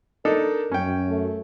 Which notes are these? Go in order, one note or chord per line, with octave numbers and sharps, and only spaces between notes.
D4 D#4 A4 A#4
F#2 C#4 G5
A3